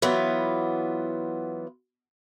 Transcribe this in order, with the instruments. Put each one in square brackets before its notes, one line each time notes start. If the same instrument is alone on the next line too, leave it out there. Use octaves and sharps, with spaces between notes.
[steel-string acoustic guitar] E3 F#3 B3 F4